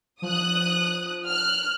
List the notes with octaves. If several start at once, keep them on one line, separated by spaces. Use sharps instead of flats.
F3 D#6 F#6
F6 F#6